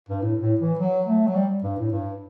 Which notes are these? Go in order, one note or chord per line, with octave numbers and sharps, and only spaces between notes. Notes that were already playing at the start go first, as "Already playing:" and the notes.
G2
A2
A2
E3
F#3
A3
F#3
G3
G2
A2
G2